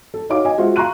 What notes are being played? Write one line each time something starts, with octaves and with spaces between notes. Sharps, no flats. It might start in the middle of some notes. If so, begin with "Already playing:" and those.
A4
D#4 F#4 C#5 F5 D6
D#5 G#5
G#3 F4 F#4 C5 E5
F5 A#5 C6 C#6 F#6 D#7